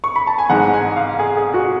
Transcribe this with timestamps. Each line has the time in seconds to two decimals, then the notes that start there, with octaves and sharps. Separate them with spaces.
0.04 C#6
0.16 B5
0.27 A5
0.38 G#5
0.50 A1 G#2 G#3 F#5
0.73 G#5
0.96 F5
1.19 G#4
1.37 G#4
1.54 F#4